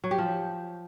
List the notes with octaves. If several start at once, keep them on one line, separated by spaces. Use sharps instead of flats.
F#3
G4
F3